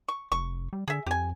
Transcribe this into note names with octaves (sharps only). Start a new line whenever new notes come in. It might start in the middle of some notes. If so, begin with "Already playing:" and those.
C#6
F1 C#6
G3
D3 G#4 E5
F2 G4 G#5